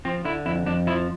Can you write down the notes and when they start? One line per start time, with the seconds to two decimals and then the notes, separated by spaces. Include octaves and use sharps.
0.05 F3 C4
0.25 D3 E4
0.46 F2 E4
0.66 F2 D4
0.87 F3 E4